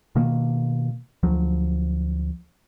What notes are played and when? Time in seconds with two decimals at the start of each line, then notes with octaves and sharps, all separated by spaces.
0.15 B2 D#3 A#3
1.23 D2 F3 F#3